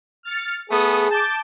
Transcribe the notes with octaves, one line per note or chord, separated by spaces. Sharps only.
F6 A6 C#7
A3 B3 G#4 D#6
A5 D6 G6